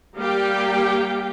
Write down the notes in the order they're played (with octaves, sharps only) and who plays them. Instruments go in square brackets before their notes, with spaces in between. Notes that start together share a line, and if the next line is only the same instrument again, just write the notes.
[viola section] G3 A#3 G4 F5 G5